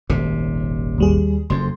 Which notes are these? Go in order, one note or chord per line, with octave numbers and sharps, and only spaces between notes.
D#1 G#1 C3
D#2 G3 G#4
F#1 F2 C6